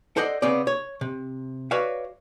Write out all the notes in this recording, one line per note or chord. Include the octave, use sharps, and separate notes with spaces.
A4 C5 D5 D#5 F#5
C#3 B3 C4 D5
C#5
C3
F#4 B4 C#5 D5 E5 F5